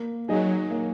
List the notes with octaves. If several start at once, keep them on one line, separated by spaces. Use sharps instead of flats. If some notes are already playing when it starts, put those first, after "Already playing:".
Already playing: A#3
F#3 D#4 G#4 D#5
A#3